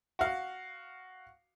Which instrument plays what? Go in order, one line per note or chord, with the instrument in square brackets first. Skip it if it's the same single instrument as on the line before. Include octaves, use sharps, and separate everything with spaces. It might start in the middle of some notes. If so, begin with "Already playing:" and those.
[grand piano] F#4 F5